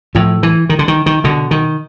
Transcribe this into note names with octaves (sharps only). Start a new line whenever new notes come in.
A2 F3
E3
D#3
D3
D#3
D#3
B2 D3
D#3